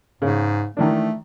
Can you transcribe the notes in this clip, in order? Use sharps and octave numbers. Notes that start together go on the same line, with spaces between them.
G#2 C#3
D#3 E3 A3 D4